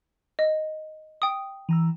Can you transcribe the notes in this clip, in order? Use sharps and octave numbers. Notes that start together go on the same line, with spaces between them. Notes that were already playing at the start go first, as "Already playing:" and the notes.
D#5
G5 D#6
E3 A#5 E6